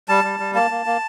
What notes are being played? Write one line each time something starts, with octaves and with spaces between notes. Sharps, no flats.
G3 A5
G3
G3
A#3 A5
A#3
A#3